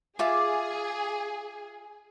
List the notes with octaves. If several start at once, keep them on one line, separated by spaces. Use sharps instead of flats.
F4 G#4 E5 D6